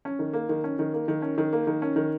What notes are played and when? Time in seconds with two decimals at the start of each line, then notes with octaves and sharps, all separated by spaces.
0.05 C#4
0.19 D#3
0.33 A#3
0.49 D#3
0.64 C#4
0.79 D#3
0.94 A#3
1.08 D#3
1.22 C#4
1.38 D#3
1.53 A#3
1.67 D#3
1.82 C#4
1.96 D#3